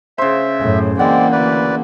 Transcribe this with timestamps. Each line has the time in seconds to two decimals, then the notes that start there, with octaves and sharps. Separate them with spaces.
0.18 C#3 C5 E5
0.60 F#2 A2
0.99 E3 G#3 A#3 C4 D5 F#5
1.32 D2 B4 D5